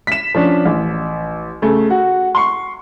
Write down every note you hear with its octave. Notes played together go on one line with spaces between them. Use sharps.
B6 E7
F3 C#4 D4
A1
C#3 A3
F#4
C6 C#6